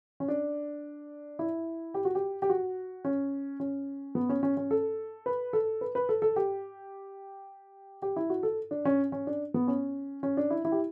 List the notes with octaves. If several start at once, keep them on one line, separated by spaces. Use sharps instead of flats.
C#4
D4
E4
G4
F#4
G4
G4
F#4
C#4
C#4
B3
C#4
C#4
C#4
A4
B4
A4
B4
B4
A4
A4
G4
G4
E4
F#4
A4
D4
C#4
C#4
D4
B3
C#4
C#4
D4
E4
E4
G4